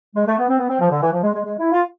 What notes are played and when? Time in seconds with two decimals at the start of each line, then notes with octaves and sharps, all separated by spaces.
0.15 G#3
0.26 A3
0.37 B3
0.48 C4
0.58 B3
0.69 C4
0.79 F3
0.90 D3
1.01 E3
1.12 F3
1.22 G#3
1.33 G#3
1.43 G#3
1.58 E4
1.72 F4